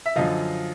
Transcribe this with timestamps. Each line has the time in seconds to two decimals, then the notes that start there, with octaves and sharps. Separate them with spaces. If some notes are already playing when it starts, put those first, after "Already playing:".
0.06 E5
0.16 F#2 D3 F3 D#5 F5